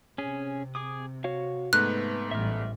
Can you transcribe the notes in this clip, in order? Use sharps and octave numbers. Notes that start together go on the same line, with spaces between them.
C3 C#4 G#4
G#4 D6 D#6
F#4 C#5 F5
G#2 A3 B3 B4 F#6
A1 G3 E5 F6